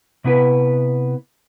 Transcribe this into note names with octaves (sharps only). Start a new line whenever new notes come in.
C3 B3 E4 B4